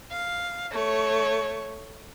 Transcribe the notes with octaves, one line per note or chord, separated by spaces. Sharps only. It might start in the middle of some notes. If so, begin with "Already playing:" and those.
F5
A3 C#5